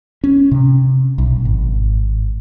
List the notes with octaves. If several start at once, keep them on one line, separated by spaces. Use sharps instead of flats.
C#4
C3
B1
G#1